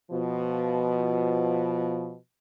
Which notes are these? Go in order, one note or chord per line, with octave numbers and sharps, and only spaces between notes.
B2 F3